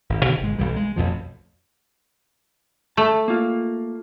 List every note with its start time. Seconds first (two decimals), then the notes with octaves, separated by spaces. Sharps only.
0.10 G#1
0.25 B2 D3 D#3
0.41 G#1 G#3
0.58 B1 E3 G3
0.76 G#3
0.96 A1 F2 B2 F3
2.97 A3 A5
3.28 A#3 F4